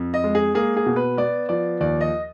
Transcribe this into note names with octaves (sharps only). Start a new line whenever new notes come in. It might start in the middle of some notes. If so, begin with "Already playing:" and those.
Already playing: F2
D#5
G#3
G#4
A#3 G#4
G#4
B2
B4
B3 D5
F3 D5
D#2 D5
D#5